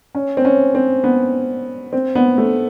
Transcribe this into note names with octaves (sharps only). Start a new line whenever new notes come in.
C#4
C4
C#4
C4
B3
C4
B3
A3